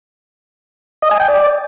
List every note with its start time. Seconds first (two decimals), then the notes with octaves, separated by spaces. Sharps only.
1.02 D#5
1.11 G#5
1.20 G5
1.28 D5